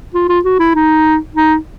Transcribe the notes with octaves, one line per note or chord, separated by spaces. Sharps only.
F4
F4
F#4
E4
D#4
D#4